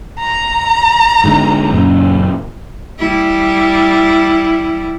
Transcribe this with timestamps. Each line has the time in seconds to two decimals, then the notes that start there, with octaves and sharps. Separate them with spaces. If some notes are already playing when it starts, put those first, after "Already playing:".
0.19 A#5
1.24 G#2 D3 G#3
1.74 F#2 A#2 C#3
2.99 G3 E4